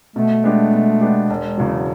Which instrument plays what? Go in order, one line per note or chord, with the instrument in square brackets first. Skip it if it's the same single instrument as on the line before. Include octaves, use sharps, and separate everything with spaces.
[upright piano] B2 [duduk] A3
[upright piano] G#3 B3 D4 G4
B2
G#3 B3 D4 G4
E1
E2 C#3 F#3